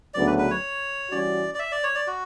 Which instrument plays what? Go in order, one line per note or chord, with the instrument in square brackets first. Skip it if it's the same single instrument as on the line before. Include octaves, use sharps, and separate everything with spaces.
[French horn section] D2 C#3 F#3 B3 D4 [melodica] D5
[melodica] B4
B4
C#5
[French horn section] E3 G3 C#4 F#4 [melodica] D5
[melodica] D5
E5
D5
C#5
D5
F#4